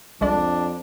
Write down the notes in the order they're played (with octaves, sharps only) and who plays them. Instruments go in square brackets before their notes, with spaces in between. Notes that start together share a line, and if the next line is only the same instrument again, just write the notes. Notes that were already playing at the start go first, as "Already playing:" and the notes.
[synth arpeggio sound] C2 G#3 D5 [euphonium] F2 [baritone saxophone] D4